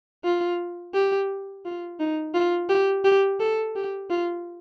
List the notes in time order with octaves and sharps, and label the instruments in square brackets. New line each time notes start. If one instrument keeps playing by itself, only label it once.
[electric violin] F4
G4
F4
D#4
F4
G4
G4
A4
G4
F4